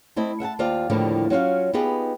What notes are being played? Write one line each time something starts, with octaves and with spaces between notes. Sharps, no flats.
A3 C4 E4 D#5
E5 F#5 G#5 A5
D#2 F4 C5 D5 F5
D#2 A2 D3 F3 G3 A#3
F#3 C#4 F4 F5
B3 D#4 F4 G4 G#4 B4